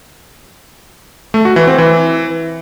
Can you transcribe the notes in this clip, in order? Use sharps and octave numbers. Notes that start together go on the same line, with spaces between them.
A3
F#4
E3
C4
E3